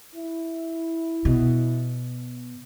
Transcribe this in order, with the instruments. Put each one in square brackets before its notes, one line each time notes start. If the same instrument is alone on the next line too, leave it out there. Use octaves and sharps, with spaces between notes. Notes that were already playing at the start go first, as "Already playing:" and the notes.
[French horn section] E4
[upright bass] B2